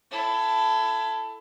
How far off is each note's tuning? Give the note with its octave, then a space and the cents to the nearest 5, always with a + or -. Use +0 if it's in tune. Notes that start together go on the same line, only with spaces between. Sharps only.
E4 +25 A4 +0